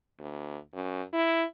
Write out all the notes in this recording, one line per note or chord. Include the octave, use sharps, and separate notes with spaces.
D2
F#2
E4